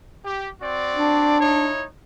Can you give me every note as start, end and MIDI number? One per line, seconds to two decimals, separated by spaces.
0.24 0.50 67
0.62 1.39 60
0.62 1.39 66
0.62 1.39 74
0.95 1.72 62
1.40 1.85 63
1.40 1.85 64
1.40 1.85 73